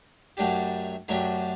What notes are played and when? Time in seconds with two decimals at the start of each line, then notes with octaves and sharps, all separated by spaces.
0.37 F#2 F#3 A3 D4 G4
1.08 F#2 F#3 A3 D4 G4